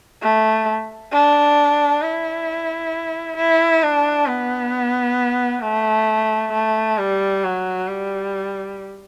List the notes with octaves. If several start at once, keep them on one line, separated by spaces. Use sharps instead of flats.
A3
D4
E4
E4
D4
B3
A3
A3
G3
F#3
G3